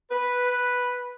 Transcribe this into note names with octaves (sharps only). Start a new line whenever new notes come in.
B4